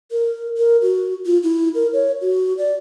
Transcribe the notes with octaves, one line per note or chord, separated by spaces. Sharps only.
A#4
A#4
F#4
F4
E4
A#4
C#5
F#4
D5